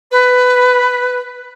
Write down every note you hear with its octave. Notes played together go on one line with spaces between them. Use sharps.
B4